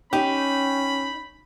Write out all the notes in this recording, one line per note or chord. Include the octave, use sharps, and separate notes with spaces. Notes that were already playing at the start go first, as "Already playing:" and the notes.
C#4 D#4 G4 B5